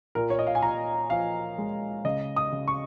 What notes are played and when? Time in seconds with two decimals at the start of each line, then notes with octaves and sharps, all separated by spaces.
0.15 A#2 A#4
0.30 C#5
0.39 D#5
0.47 F5
0.55 G#5
0.62 A#2 A#5
1.10 F3 F5
1.58 G#3
2.05 C#3 D#5
2.36 D#6
2.52 C#3
2.68 C#6